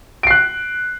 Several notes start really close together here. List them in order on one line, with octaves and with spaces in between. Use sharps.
D7 C7 F#6